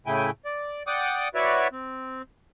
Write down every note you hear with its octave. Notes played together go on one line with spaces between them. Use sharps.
A2 C#3 A3 E4 G5 G#5
D5
D5 F#5 G5 D6 D#6
E4 F#4 B4 C#5 D5 E5
C4